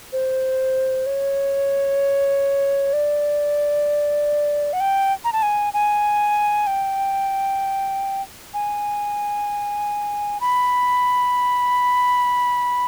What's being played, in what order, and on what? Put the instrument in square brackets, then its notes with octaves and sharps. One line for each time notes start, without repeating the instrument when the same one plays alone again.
[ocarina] C5
C#5
D5
F#5
G5
A#5
A5
G#5
G#5
G5
G#5
B5